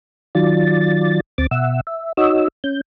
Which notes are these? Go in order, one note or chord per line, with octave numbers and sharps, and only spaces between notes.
D#3 F#3 F4 D5 A6
D2 C4 D6 A6
B2 E5 F#5 E6
E5
D#4 F#4 C#5 D#5 E6
C#4 G6